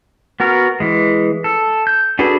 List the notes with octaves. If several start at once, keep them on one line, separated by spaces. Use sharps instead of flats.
B3 F#4 A#4
E3 G#3
A4
G6
D4 F#4 G#4 A4 B4